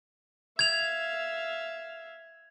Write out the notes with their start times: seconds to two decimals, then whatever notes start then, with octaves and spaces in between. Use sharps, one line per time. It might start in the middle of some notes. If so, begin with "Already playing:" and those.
0.59 E5 F5 G#6 F7